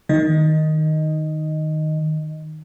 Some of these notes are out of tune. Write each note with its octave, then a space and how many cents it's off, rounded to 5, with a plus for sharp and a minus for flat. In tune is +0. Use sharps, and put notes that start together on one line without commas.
D#3 +0 D#5 +0